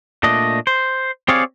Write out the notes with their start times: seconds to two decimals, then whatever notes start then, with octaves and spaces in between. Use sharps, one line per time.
0.23 A#2 A3 D4 D#5
0.67 C5
1.28 C4 G4 G#4 C#5 D5 F5